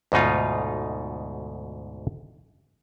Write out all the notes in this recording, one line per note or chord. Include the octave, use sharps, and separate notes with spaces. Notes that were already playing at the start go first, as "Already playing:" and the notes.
D2 G#2 B2 D#4 F4